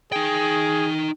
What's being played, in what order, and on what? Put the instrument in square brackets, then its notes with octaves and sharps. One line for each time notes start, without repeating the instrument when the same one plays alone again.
[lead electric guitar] D#4 G5 [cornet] G#4